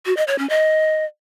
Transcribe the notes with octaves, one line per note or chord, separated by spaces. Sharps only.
F#4
D#5
C#5
C#4
D#5